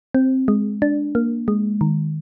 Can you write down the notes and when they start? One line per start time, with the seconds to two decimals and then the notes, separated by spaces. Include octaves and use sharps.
0.15 C4
0.48 G#3
0.82 D4
1.15 A#3
1.48 G#3
1.81 D#3